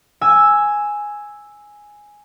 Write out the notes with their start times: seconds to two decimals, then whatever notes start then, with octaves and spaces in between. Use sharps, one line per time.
0.21 G#5 E6